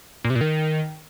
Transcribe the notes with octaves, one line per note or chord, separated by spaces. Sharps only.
A#2
C3
A#2
D#3